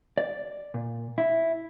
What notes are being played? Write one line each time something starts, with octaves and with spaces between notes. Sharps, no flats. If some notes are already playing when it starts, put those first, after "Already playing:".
D5
A#2
E4